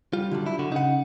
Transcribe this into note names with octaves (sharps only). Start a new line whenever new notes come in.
G3 F4
D3 F#3 G3
E4
D3 F#4
C#3 D#4 F#5